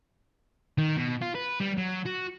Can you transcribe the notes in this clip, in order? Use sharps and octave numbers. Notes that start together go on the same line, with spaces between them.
D#3
B2
F4
B4
G3
F#3
F#4